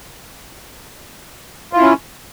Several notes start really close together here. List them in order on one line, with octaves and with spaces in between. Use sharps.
F4 E4 C#4